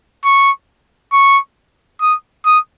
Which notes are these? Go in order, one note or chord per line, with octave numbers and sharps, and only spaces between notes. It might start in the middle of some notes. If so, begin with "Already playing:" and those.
C#6
C#6
D#6
D#6